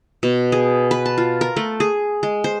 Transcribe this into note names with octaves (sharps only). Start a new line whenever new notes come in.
B2
G#4
B4
A5
F4
A#4
A3
G#4
G#3
C5